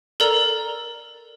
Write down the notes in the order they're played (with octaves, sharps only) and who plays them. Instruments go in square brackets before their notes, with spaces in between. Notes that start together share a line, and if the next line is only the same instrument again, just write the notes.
[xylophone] A4 A#4 D5 A#5